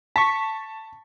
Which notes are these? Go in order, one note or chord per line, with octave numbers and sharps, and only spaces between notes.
A5 C#6 B6